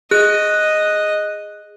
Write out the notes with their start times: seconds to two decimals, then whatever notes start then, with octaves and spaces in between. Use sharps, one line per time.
0.11 G#4 D#5 F#6